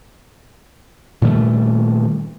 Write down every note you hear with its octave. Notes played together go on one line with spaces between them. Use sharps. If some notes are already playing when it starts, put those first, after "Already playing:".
A#2 D#3 G3 A3